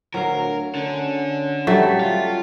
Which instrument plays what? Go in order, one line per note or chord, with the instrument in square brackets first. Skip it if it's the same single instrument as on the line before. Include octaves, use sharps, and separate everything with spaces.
[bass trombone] D2 [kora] F#3 F5 [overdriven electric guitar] A#4
[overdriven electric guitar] D3 [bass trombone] C#4
[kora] F#3 G3 [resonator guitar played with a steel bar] A3
[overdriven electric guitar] F4